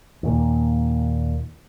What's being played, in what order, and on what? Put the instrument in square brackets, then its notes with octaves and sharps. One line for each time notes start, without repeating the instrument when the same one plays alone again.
[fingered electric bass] D#2 A#2